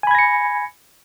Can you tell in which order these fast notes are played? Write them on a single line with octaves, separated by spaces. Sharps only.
G#5 B5 G#6 A#6 C#7